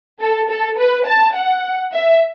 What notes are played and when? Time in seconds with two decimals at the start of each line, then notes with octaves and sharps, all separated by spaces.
0.21 A4
0.49 A4
0.77 B4
1.06 A5
1.35 F#5
1.93 E5